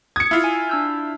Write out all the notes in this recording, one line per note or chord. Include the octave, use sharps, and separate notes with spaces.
D#6 G#6 C#7
E4 F4
G#5
D4 E6 G6